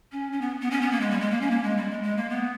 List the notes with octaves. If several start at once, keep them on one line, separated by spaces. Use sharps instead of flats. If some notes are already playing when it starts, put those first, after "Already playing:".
C#4
C#4
B3
B3
C#4
B3
A#3
G#3
G3
G#3
A#3
C#4
A#3
G#3
G3
G#3
G#3
A#3
B3